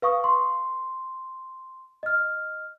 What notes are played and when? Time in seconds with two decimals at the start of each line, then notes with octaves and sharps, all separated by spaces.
0.02 B4 F5 C#6 D#6
0.24 C6
2.03 D#5 F6